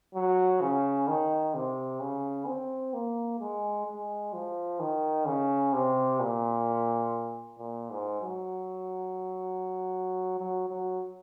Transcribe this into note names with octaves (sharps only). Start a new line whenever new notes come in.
F#3
C#3
D#3
C3
C#3
C4
A#3
G#3
G#3
F3
D#3
C#3
C3
A#2
A#2
G#2
F#3
F#3
F#3